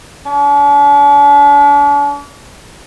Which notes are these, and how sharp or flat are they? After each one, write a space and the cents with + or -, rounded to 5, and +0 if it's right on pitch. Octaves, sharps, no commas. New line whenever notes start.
D4 -45